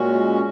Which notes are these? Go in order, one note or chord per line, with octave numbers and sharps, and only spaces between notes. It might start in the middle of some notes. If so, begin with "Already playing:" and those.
Already playing: A#2 G#3 C#4 F#4